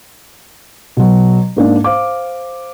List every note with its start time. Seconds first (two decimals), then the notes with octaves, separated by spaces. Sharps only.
0.97 B2 F#3
1.56 G#2 A#3 D4
1.84 C5 F5 D6